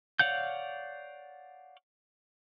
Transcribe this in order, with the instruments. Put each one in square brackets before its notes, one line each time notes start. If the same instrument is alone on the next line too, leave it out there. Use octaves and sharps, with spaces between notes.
[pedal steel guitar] C#5 D5 F5 F#5 G6